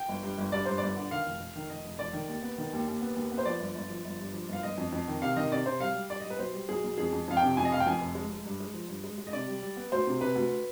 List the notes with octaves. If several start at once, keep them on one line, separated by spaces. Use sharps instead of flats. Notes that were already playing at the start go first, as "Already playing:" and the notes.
Already playing: G5
G1
G2
G1
G2 D5
G2 C5
G1 D5
D3
D#3 F5
F1
F1
D#3
F1 D#5
F1
F1 D5
D#3
D#2
B3
D#3
D#2
D#2
B3
D#2
B3
C5
F3 D5
G1
G1
F3
G1
G2
F3
G1 F5
G1 D#5
F2
F2
D#3
C3 F5
D#3 D#5
C3 D5
C3 C5
G3 F5
G3
G3 D5
D#5
G3
B4
B1 C5
G3
B1 G#4
B1
F2 G#4
F2
F2 F5
G5
C3
F2 G#5
D#5
F1 F5
G5
F2 G#5
F1
G#3
G#3
G2
G#3
F3
G2
G#3
G#3
D#5
C3 D5
G3
G3
B3
D2 C5
C3
C3 B4
D2